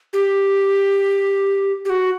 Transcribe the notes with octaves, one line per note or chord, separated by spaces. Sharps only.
G4
G4
F#4